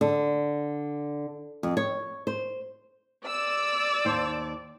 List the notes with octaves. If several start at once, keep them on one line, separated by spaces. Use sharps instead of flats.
D3
F2
C#5
C5
D5 E6
D#2 C5 A5